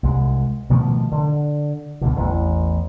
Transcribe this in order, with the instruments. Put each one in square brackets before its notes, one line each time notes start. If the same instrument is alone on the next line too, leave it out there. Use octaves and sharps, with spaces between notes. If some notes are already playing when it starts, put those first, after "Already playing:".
[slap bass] C2 G#3
B2 D#3 F3 A3
D3
C#2 B2 D3
A1 E2